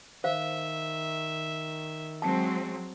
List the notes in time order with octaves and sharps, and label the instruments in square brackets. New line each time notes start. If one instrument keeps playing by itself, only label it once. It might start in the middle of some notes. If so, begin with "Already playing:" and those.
[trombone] D#3 [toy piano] C5 F5 [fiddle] E5
[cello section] F#3 G#3 C4 [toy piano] A5